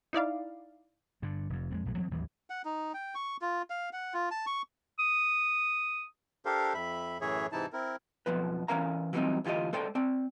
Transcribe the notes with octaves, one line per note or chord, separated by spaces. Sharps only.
D#4 E4 D5 F5
G2 D3
F1 F2
F2 F#3 G#3
B1 A2 F#3
E3 F3 A3 C4
A1 D#2 E3 F#3
F#5
D#4
G5
C#6
F4
F5
F#5
F4
A5
C#6
D#6
D4 G4 A4 A#4 C5 F5
F2 E5 B5
F#2 A2 E3 G#4 C#5 E5
G#2 C3 E3 D#4 E4 A5
C4 E4 A#4
B1 F2 B2 F3 B4
E3 F3 C#4 A#4 F5 A#5
E3 F#3 G3 A#3 C4 D#4
D2 E3 F4 G4 D#5
G#3 A4 C5 D5 G5
C4 D5